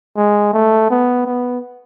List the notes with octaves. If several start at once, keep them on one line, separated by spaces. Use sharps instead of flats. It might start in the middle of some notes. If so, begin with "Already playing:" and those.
G#3
A3
B3
B3